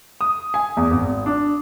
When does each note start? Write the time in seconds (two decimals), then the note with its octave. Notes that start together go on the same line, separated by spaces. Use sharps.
0.21 D#6
0.54 G#5
0.77 E2
0.91 G#1
1.26 D4